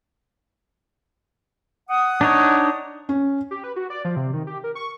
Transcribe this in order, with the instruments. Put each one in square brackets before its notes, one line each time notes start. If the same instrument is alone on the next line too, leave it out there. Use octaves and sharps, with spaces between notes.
[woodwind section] F#5 D#6
[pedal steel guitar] D4 D#4 C#5
[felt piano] C#4
[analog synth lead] G4
B4
F#4
D5
F3
C3
D#3
G4
A#4
C#6